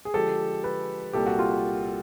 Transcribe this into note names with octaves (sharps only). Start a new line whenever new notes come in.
G#4
D3 F3 G#3 G4 A4
A4 B4
C2 A#2 G3 A#3 G4 A4
F#4
F4 G4